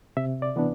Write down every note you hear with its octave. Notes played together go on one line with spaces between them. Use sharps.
C3 E5
D5
E3 B3 D4